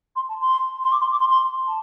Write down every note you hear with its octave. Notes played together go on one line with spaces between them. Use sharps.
C6
A5
C6
C6
D6
C6
D6
C6
C6
A5